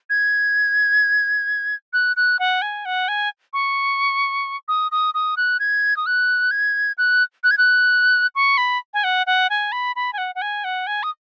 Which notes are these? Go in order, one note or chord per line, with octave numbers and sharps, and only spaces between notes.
G#6
F#6
F#6
F#5
G#5
F#5
G#5
C#6
D#6
D#6
D#6
F#6
G#6
D#6
F#6
G#6
F#6
F#6
G#6
F#6
C#6
B5
G#5
F#5
F#5
G#5
B5
B5
G#5
F#5
F#5
G#5
F#5
G#5
D#6